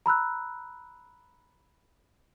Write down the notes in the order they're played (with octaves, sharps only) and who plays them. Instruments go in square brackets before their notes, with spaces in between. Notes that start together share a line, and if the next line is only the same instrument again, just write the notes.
[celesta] A#5 B5 E6 F#6